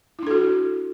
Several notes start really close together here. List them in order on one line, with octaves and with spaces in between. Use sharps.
E4 D4 A4 F#4